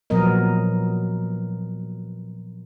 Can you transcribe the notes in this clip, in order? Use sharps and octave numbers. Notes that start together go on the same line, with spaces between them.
A#2 F3 F#3 B3 A#4 D#5